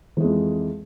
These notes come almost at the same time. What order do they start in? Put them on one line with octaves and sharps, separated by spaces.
E3 G#3 F2